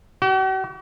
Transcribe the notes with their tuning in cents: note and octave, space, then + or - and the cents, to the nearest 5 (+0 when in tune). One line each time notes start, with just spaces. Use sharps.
F#4 +45